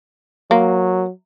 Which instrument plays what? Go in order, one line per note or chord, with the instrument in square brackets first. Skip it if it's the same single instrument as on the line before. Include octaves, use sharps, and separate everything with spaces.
[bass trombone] F#3 [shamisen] A#3